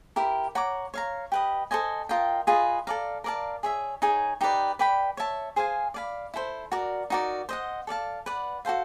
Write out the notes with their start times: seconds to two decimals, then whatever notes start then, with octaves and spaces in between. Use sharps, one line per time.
0.16 E4 G4 A#4
0.55 C#5 F#5 A#5 D6
0.94 C#5 F5 A#5
1.32 G4 B4 D#5
1.71 A4 C5 D#5 G#5
2.09 F4 A#4 D#5 G5
2.47 F4 G#4 B4 D#5
2.87 A4 D5 F5 A#5
3.24 A#4 D5 F5 A5
3.63 G#4 C#5 E5
4.02 D#4 G#4 C#5
4.41 D#4 G4 B4 D5
4.79 B4 D5 G5 B5
5.17 C#5 E5 A5
5.56 G#4 C5 F5 G#5
5.94 D5 F5 G#5 B5
6.34 E4 A4 C5
6.72 F#4 A#4 D5
7.10 D#4 F#4 A#4 D5
7.49 C5 D#5 F#5
7.87 A4 D5 F5 A5
8.26 B4 D5 F#5
8.65 F#4 A4 C5 F5